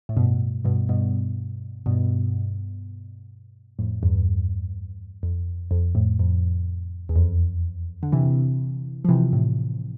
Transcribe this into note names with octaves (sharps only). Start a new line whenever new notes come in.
A2
G2 B2
G2 B2
G2 B2
G2 B2
F2 A2
E2 G2
F2
F2
F2 A2
F2
E2
F2
D3
C3 E3
F3
C3 E3
A2 C3